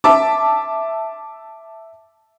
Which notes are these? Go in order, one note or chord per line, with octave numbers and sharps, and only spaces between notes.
E5 A5 D6